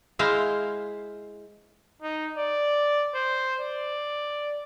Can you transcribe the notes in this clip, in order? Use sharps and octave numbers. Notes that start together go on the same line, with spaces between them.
G#3 E4 C5 F5
D#4
D5
C5
D5